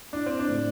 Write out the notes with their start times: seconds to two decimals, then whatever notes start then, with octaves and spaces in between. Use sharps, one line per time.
0.13 D4 E4
0.26 C4
0.39 D4
0.49 A2